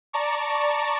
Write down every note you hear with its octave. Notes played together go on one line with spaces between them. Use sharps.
D5 A5 A#5 C#6